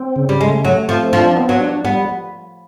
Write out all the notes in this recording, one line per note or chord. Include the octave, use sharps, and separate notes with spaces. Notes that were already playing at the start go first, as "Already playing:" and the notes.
Already playing: C4
C#3
G3
G#3 A3
F#3 A3
F3 C4
F3 D4
B3
F#3
D4
G3 B3